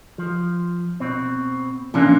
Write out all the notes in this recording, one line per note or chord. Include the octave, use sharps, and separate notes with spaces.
F3
B2 C4
C3 E3 F3 A#3 C#4 D4